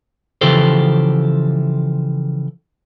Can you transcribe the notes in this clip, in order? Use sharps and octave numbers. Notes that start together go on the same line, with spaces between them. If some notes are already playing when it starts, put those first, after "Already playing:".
C#3 E3 F3 G4 A4 C5